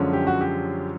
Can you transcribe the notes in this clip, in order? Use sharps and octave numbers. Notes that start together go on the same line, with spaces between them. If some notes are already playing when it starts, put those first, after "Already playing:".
Already playing: F#2 D3 F3 G#3 C#4
G4
F#4
G4